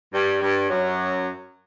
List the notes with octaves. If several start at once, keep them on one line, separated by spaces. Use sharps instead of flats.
G2 G3
G2 G3
F#2 F#3